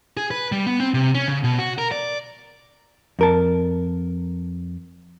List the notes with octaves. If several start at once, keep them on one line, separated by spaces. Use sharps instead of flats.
G#4
B4
G3
B3
C4
C3
C#4
C#3
B2
F#4
A#4
D5
F2 A#4 A5